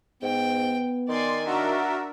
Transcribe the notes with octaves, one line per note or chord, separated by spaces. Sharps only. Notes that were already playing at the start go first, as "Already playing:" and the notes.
G#2 B3 G5
D#3 D5 G#5 C6
D4 F#4 A#4 E5